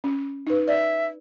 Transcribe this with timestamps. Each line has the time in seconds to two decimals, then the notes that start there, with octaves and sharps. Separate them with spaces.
0.04 C#4
0.47 D#4 B4
0.68 D5 E5